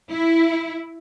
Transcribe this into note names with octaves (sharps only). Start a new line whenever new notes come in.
E4